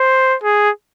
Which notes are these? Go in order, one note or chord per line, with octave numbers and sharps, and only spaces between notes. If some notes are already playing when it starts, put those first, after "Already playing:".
Already playing: C5
G#4